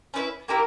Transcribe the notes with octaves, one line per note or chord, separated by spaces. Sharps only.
C#4 E4 B4 E5
A#3 E4 G4 A#4